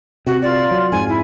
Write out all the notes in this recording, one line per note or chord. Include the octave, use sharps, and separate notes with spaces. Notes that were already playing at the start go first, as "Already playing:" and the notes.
C3 F#4
F4 A#4 D5
F#3
F2 G#2 G#5
E4 B5